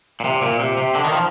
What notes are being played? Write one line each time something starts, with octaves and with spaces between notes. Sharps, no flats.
A#2
C3
A#2
C3
C3
D3
D#3
F3